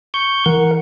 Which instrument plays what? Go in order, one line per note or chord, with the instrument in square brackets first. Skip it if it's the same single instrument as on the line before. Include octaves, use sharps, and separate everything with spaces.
[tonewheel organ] C#6 G6
[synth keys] E3 [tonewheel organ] A#4 F#5